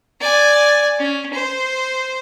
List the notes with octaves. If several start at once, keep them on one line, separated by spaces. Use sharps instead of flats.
D5 G#5
C#4
C5